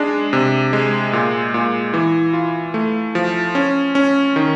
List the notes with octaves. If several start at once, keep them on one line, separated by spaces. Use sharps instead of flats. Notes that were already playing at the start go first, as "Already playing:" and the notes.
Already playing: G#3 D4
C3
G#3
A#2
A#2
E3
F4
A3
F3
C#4
C#4
D#3